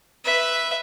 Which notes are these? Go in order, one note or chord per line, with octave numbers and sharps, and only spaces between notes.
B4 E5